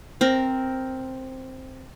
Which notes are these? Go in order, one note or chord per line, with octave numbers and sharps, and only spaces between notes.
C4 A#4